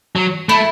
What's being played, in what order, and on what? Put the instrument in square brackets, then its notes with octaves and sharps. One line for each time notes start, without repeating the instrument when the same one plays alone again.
[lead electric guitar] F#3
[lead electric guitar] A3 [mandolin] E4